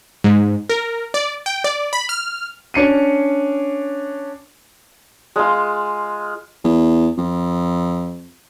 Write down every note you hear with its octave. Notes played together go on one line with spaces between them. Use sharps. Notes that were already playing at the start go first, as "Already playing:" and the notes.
G#2
A#4
D5
G5
D5
B5
F6
C#4 D4 C#7 D#7
G#3 F4
E2
F2